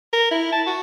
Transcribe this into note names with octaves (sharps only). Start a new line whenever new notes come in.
A#4
E4
A5
F#4